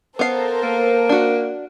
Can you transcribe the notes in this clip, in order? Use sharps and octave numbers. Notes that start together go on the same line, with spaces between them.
B3 A4 A#4 C5 F5
A#3
D4 F#4